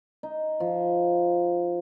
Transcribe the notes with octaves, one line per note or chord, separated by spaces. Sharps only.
D#4
F3